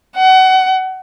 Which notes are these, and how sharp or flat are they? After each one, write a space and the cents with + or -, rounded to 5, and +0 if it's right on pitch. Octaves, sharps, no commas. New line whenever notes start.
F#5 +30